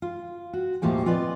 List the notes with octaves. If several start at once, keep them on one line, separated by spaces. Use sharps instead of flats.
F4
F#4
D#2 A2 F3 A#3 G4 G#5
C4 F4 B4 D5 D#5